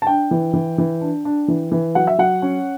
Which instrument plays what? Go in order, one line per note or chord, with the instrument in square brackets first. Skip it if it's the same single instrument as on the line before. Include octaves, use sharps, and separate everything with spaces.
[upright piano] A5
D4 G5
E3
E3
E3
D4
D4
E3
E3
F#3 F#5
E5
F#3 F#5
C#4